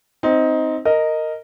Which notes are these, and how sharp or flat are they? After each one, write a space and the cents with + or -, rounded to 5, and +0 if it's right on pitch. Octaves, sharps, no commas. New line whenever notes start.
C4 +0 D#4 +15
A#4 -15 D#5 +0